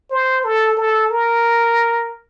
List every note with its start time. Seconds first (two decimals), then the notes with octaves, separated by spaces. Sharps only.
0.10 C5
0.44 A4
0.77 A4
1.11 A#4